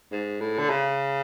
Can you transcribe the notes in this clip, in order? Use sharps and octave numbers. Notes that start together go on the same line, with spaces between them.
G#2
A2
D3
C#3